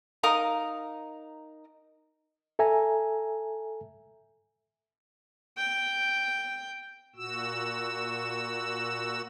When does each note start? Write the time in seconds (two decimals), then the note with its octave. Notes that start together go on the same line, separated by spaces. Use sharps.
0.23 D#4 A#4 F5 D#6
2.59 A4 E5 G#5 A#5
5.57 G5
7.16 A#2 F#4 E6